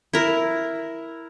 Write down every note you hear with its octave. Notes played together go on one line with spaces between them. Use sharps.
E4 A#4